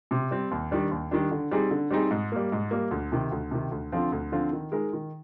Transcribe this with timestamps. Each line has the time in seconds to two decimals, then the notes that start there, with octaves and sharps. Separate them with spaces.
0.11 C3
0.31 G3 C4
0.51 D#2
0.71 D#3 G3 D4
0.91 D#2
1.11 D#3 G3 D4
1.31 D3
1.51 G3 C4 D#4 G#4
1.71 D3
1.90 G3 C4 D#4 G#4
2.11 G#2
2.32 G3 A#3
2.52 G#2
2.71 G3 A#3
2.91 D2
3.12 C3 D#3
3.31 D2
3.51 C3 D#3
3.71 D2
3.92 D3 F3 C4 F4
4.12 D2
4.32 D3 F3 C4 F4
4.52 D#3
4.72 G#3 D#4 A#4
4.93 D#3